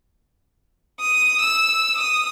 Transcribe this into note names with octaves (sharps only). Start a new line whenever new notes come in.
D#6
E6
D#6